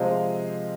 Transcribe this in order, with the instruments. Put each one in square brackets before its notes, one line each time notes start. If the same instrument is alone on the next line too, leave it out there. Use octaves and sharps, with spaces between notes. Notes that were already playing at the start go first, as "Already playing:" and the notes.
Already playing: [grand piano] C3 F3 G#3 C4 D#5 F5